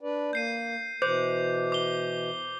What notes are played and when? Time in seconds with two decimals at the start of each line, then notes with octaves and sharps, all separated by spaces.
0.01 D4 B4 D5
0.33 A#3 G6 C7 D#7
1.02 B2 E3 C5 D6 G6
1.72 D6 G7